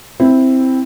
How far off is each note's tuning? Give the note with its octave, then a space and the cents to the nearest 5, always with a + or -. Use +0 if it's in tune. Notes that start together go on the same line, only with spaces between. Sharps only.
C4 +0 E4 +0